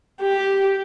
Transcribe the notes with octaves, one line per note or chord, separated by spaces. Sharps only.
G4